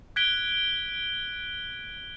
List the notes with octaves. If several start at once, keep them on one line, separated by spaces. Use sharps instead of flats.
F#6 G#6 B6 D7 G7